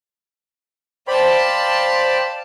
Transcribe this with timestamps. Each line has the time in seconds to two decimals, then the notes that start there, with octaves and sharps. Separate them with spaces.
1.07 C5 D5 F5 G5 A5 B5